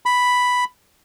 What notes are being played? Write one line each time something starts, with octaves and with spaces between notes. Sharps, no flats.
B5